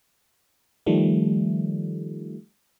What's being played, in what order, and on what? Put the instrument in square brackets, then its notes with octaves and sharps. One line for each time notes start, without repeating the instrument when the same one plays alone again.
[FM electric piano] D#3 F3 G3 A3